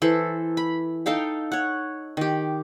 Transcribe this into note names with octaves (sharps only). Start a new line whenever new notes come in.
E3 A4 C5
B5
D#4 A4 F5 G5
C#5 F#5
D#3 G4